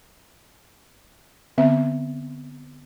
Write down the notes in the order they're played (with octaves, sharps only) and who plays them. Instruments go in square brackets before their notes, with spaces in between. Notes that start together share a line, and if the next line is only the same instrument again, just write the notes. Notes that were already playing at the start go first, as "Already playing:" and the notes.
[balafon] D3 B3 C4 E5